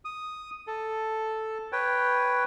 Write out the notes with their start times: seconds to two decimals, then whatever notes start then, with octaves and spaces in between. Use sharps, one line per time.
0.05 D#6
0.67 A4
1.72 B4 C#5 G5